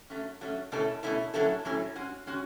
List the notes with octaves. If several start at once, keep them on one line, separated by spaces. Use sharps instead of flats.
F#3 A3 C#4
F#3 A3 C#4
B2 A3 C#4 E4 A4
B2 A3 C#4 E4 A4
A2 F#3 C#4 E4 A4
A2 F#3 C#4 E4 A4
G#3 C#4 F#4
G#3 C#4 F#4